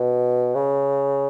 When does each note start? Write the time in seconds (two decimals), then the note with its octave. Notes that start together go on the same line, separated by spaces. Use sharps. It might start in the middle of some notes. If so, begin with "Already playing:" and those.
Already playing: B2
0.55 C#3